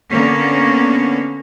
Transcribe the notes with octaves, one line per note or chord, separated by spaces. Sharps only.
D3 A#3 B3 C#4